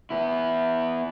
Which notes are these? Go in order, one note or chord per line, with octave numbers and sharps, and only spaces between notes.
B3 E4